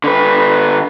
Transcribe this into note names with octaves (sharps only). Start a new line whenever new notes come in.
D3 B4